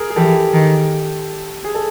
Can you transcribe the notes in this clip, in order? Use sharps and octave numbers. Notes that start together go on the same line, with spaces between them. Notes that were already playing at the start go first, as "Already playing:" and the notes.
Already playing: G#4 A#4
G#4
E3 G4 A4
D#3
G#4
A4